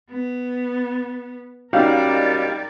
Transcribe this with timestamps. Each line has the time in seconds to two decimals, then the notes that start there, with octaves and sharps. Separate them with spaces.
0.10 B3
1.73 G3 A#3 C#4 D#4 F#4 A#4 D5 F5